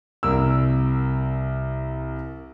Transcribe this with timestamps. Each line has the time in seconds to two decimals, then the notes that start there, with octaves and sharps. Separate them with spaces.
0.23 C2 A#4 E6